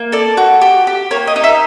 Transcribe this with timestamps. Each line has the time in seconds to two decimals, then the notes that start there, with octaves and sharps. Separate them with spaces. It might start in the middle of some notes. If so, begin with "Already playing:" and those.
Already playing: A#3
0.12 A4 D5
0.37 F#4
0.61 G4
0.87 G4
1.11 A#3 C#5
1.27 D#5
1.36 D#4
1.44 E5